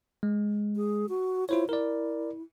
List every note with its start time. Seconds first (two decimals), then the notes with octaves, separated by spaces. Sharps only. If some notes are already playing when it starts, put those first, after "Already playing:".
0.23 G#3
0.76 G#4
1.09 F#4
1.49 E4 F4 C5 C#5
1.69 E4 A#4 D5